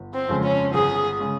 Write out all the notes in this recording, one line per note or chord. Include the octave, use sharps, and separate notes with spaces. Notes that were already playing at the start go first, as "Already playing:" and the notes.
Already playing: G1
C4
F2 C#3 G#3
C#4
G1 G#4
C#3 G#3